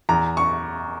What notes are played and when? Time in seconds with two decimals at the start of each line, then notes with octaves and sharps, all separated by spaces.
0.09 E2 A#5
0.37 C#6